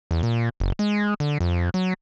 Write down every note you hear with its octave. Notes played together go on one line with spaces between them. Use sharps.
E2
A#2
F#1
G#3
D3
F2
F#3